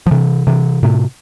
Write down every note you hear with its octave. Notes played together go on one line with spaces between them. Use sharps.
F3
C3 E3
C3 E3
A2 C3